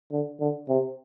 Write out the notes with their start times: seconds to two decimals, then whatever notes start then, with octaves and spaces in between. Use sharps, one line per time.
0.11 D3
0.40 D3
0.68 C3